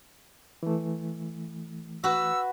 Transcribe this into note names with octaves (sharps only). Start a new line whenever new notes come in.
E3 A3
F#4 B4 E6